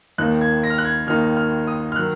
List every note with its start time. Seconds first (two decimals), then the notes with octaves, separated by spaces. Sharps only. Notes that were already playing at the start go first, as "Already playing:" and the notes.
0.18 D#2 D#3 A#3 D#4 F#6
0.41 G#6
0.63 A#6
0.70 F6
0.78 F#6
0.85 G#6
1.07 D#2 D#3 A#3 D#4 F6
1.37 F6
1.67 D#6
1.92 F6
1.96 D#3 F#3 F#6